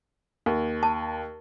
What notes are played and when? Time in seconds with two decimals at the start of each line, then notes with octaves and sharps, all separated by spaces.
0.46 D#2
0.83 A5